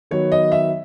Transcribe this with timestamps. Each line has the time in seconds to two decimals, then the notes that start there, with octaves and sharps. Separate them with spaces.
0.11 D#3 F#3 B3 C#5
0.32 D#5
0.52 E5